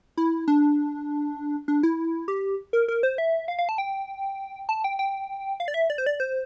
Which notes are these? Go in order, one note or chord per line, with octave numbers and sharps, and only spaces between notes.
E4
D4
D4
E4
G4
A#4
A#4
C5
E5
F5
F5
A5
G5
A5
G5
G5
F5
D5
E5
D5
C5
D5
C5